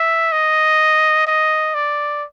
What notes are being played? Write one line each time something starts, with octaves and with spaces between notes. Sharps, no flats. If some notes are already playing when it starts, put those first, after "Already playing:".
Already playing: E5
D#5
D#5
D5